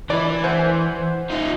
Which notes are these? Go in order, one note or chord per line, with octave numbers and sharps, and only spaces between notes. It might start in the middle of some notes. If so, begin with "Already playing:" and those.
E3 E4 D5
C5 F#5 G#5
D#4 F4